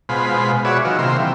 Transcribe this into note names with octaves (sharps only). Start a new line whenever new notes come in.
B2 G#3 F4 C5 B5
F#4 G#4 B4 C#5 D5 E5
D#3 F#3 F4
C3 A#3 F4 E5 C6
E3 G3